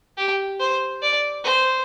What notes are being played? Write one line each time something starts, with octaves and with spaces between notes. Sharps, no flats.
G4
C5
D5
C5